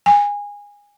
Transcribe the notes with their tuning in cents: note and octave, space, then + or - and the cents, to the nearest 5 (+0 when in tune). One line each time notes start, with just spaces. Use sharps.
G#5 -20